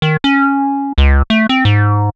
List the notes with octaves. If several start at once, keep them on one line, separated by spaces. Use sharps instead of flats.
D#3
C#4
C#2
A3
C4
G#2